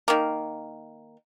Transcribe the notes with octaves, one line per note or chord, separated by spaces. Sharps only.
D#3 A#3